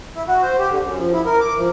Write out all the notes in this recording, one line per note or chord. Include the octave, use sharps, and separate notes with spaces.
E4
F#4
C5
G4
D3
F#2
F3
E4
A#4
D6
F3